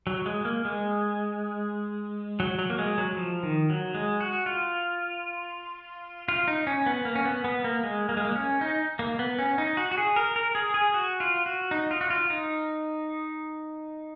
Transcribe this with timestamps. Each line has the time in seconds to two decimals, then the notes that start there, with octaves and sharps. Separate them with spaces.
0.07 F#3
0.26 G#3
0.45 A#3
0.65 G#3
2.40 F#3
2.59 F#3
2.70 A#3
2.79 G#3
2.98 F#3
3.17 F3
3.43 D#3
3.70 F#3
3.95 G#3
4.21 F#4
4.46 F4
6.28 F4
6.48 D#4
6.67 C#4
6.86 B3
7.05 A#3
7.16 C#4
7.26 B3
7.44 B3
7.64 A#3
7.83 G#3
8.09 A#3
8.17 G#3
8.24 A#3
8.35 C#4
8.61 D#4
8.99 A#3
9.19 B3
9.39 C#4
9.58 D#4
9.77 F#4
9.91 F#4
9.98 G#4
10.16 A#4
10.36 A#4
10.55 G#4
10.74 G#4
10.94 F#4
11.20 F4
11.46 F#4
11.71 D#4
11.91 F4
12.01 F#4
12.10 F4
12.30 D#4